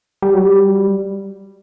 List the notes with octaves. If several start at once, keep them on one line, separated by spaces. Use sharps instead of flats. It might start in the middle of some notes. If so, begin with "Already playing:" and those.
G3
F#3
G3